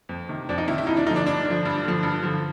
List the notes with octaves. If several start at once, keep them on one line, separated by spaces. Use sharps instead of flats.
F2
C3 D#3
F2 D4
D#4
C3 D#3 E4
E4
G2 D#4
D4
D3 F3 D4 D#4
G2 D4
D3 F3
G2
D3 F3
G2
D3 F3